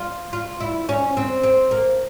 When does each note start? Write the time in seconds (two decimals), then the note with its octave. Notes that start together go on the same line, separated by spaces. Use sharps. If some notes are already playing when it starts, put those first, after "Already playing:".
Already playing: F4
0.33 F4
0.60 E4
0.89 C#4
1.17 C4
1.43 C4
1.71 A#3